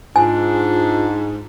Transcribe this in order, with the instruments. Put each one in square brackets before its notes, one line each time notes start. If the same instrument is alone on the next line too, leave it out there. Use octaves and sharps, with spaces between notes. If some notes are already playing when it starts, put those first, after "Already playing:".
[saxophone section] G#2 [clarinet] D4 [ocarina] F4 [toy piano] G#5